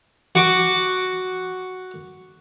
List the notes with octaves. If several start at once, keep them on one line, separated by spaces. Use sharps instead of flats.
F#4 C#6 D6